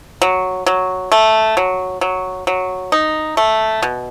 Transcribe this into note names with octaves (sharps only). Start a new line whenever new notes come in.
F#3
F#3
A3
F#3
F#3
F#3
D#4
A3
B2